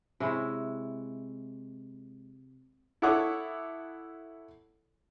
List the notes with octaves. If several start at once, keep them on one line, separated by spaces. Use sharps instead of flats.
C3 G#3 C#4 E4
E4 A4 C#5 F#5 D6 D#6